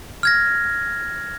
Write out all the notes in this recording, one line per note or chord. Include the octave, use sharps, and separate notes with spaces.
F6 G#6 A#6